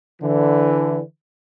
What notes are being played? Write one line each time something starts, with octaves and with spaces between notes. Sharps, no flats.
D3 E3